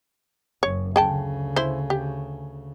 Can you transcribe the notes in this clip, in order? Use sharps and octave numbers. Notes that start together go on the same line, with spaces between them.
F#1 F#2 C#5
D2 C#3 G#4 G5 A5
E4 C5
G4